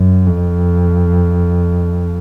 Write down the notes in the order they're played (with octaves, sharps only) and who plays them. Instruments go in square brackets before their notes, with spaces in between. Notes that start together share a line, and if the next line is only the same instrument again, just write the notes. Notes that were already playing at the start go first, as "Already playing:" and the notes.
Already playing: [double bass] F#2
F2